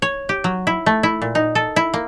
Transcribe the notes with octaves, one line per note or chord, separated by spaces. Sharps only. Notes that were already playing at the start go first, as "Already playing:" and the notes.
C#5
G4
F#3
E4
A3
E4
A#2
D#4
A4
E4
A#3